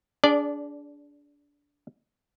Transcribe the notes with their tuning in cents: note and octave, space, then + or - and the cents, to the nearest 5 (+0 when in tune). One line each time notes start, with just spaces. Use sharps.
D4 -25 G#4 +0 D5 +0